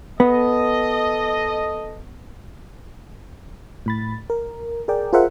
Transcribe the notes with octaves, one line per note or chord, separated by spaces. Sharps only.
B3 A4 D#5
A2 B5 A6
A#4
G#4 A#4 D5 G5
F4 G#4 A#4 C5 E5 F#5